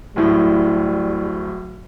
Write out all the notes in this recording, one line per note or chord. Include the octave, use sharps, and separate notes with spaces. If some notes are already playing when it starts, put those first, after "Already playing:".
D1 A2 G3